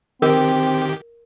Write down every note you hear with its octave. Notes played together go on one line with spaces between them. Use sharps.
D#3 C4 G4 A#4